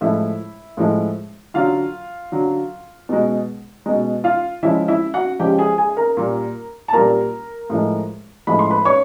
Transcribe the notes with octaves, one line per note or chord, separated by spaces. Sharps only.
A2 F3 G#3 E4 E5
A2 F3 G#3
D3 F#3 F4 F5
D3 F#3
B2 G#3
B2 G#3
F4 F5
C#3 F3 G#3 E4 E5
E4 E5
F#4 F#5
C#3 F3 G#3 G4 G5
G#4 G#5
G#4 G#5
A#4 A#5
A#2 G3
A5
A#2 G3 A#4 A#5
A2 F3 G#3
A2 F3 G#3 B5
C6
B4 B5
C#5 C#6